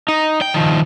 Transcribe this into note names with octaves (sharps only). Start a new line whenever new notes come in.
D#4
G5
D#3 F3